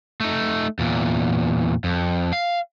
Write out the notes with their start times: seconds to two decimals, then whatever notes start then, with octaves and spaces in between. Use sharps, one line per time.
0.20 A3 D#4
0.79 E2 A#2
1.84 F2
2.33 F5